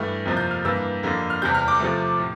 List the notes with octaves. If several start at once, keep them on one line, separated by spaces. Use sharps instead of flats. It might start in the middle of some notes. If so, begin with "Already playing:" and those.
Already playing: G2 E3 A3 F6
F2 C3 F3 A#3
G6
F6
G2 E3 A#3 E6
F2 D3 G3 A#3
F6
E2 C3 G3 G6
F6
D6
C3 F3 A3
A2